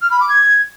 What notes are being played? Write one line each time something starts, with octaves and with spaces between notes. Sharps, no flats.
F6
B5
D6
G#6